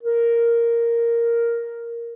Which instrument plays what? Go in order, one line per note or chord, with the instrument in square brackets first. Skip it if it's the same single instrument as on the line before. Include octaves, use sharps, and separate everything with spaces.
[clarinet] A#4